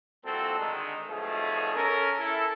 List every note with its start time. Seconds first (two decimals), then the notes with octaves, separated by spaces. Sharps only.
0.24 C2 A#2 F3 C4 F#4 A4
0.59 D3 D#3 G#3
1.08 B1 B2 F3 A3 G#4
1.75 C#4 A4 A#4
2.18 E4 A4